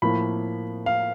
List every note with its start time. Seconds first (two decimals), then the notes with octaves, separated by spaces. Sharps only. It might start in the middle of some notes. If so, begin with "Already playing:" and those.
0.02 A2 F3 A#3 B5
0.86 F5